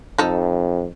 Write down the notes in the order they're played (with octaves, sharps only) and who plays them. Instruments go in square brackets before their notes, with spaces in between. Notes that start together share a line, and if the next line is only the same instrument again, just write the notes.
[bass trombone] F2 [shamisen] D#4 A4